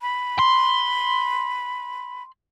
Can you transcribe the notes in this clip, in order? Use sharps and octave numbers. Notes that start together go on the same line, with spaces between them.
B5
C6